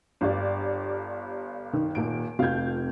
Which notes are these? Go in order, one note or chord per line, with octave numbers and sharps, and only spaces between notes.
G1 G2 D4 G4 D5 F5
D#3
D#1 D#2 D7
F1 F2 F5 G6 G#6